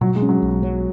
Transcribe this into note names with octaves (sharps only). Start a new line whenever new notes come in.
B2 F#3
G#3
C#4
F#3
B1
F#3